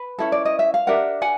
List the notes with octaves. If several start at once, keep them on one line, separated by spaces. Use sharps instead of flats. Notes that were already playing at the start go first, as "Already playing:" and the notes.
Already playing: B4
C#4 E4 A4
D5
D#5
E5
F5
D4 G4 A#4 E5 F#5
F#5 G#5